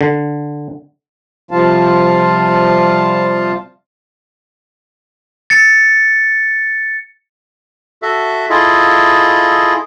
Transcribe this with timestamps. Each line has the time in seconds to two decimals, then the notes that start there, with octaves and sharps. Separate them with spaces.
0.01 D3
1.51 C3 F3 G3 F4 F5 A5
5.50 A6 C#7
8.02 F#4 A4 E5
8.50 E4 F4 G#4 A4 D#5